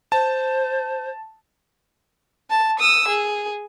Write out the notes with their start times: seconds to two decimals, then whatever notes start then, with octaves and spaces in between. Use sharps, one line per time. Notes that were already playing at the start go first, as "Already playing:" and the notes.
0.12 C5 A5
2.50 A5
2.80 D#6 E6
3.08 G#4